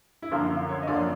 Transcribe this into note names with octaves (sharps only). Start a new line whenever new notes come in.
E4
F#2 D3 F3 A#3 F4
C#5
D#5
F#2 D3 F3 A#3 D5